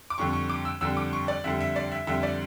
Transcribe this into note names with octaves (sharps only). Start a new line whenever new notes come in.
D6
F2 D3 G3 C#6
C#6
D6
E6
F2 D3 G3 E6
D6
C#6
D5
F2 D3 G3 E5
E5
D5
E5
F2 D3 G3 E5
D5